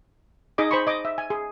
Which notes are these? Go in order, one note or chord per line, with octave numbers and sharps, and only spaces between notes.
D#4 G#4 D#5 D6
C5 B5 C#6
D#5 D6
E5
G#5
G#4